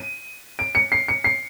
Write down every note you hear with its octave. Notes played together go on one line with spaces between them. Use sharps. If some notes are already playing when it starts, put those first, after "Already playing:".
Already playing: D#7
D7
C#7
C7
C#7
C7